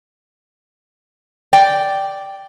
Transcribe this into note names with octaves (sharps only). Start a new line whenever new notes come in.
D5 G5